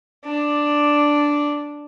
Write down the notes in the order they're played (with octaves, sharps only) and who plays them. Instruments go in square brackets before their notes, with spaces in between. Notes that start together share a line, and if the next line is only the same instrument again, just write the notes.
[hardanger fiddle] D4